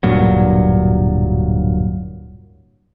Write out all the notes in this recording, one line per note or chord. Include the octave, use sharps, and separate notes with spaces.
D1 G2 A#2 F#3